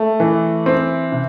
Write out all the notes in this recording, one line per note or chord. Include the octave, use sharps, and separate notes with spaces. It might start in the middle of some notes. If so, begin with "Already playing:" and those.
Already playing: A3
E3
C4
C3